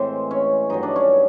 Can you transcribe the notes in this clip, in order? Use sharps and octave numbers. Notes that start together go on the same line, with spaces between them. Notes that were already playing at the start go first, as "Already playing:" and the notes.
Already playing: A2 E3 G#3 C4 C5
C#4 C#5
G2 D#3 F#3 D#4 D#5
D4 D5
C#4 C#5